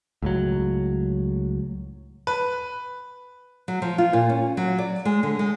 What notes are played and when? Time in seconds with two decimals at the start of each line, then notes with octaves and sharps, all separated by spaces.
0.22 C#2 A2 F#3
2.27 B4
3.68 F#3
3.82 F3
3.98 F4
4.13 A#2
4.29 C#4
4.57 F#3
4.78 D5
5.05 G#3
5.23 D3
5.39 G#3